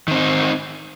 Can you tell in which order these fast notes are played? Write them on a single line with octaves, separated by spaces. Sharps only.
D#3 C4 D#4